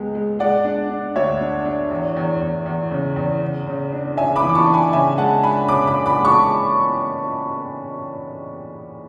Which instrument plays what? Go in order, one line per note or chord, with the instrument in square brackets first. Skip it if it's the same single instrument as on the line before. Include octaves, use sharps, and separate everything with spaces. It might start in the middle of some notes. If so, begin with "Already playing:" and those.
Already playing: [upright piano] C#2 G#3 B3
G#3
G#3 D5 F#5
D4
D4
D2 C#5 E5
D4
D4
E2
E2
E2
E2
C#3
E2
C#3
C#3
D4
C#3 E5 G#5
B5 D6
E3
D6
A5 C#6
D4
G#5 B5
C#3 E5 G#5
G#3 F#5 A5
D4 G#5 B5
C#3 B5 D6
B5 D6
D4
B5 D6
G#3
A5 C#6